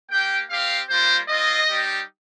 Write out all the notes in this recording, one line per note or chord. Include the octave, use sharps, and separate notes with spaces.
A#3 G4 G5
C4 G4 F5
G3 A#3 F4 C5
C4 F4 D#5
G3 D#4 G4